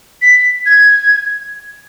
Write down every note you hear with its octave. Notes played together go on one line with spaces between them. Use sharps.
B6
G#6